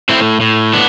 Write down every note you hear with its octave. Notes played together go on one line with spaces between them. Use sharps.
A2 C4 E4
A2
B3 D4